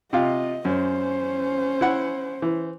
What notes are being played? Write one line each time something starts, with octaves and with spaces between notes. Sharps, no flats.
C3 F4 D#5
F#2 C#4 C5
E4 F#5
E3